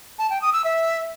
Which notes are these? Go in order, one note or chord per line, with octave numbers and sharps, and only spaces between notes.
A5
G5
D#6
E6
E5